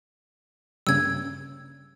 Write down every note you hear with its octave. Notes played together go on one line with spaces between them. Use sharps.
G2 C#3 A#3 E6 G#6